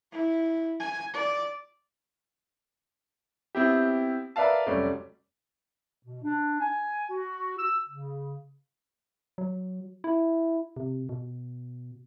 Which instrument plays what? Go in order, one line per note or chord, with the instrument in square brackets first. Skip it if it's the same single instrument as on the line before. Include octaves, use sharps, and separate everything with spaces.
[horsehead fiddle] E4
G#5
D5
[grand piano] B3 C4 E4 G4
A#4 B4 D5 E5 F5 A5
F1 F#3 G3 A3 C#4 D5
[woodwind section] B2
D4
G#5
F#4
E6
C#3
[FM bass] F#3
E4
C3
B2